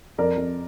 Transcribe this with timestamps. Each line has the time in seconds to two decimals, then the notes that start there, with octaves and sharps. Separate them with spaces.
0.18 F2 A#4 D5
0.37 F2